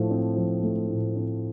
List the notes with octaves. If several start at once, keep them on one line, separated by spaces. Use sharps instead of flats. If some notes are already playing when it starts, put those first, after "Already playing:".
Already playing: A2 F3 A3
C4
F3
A3
A2
C4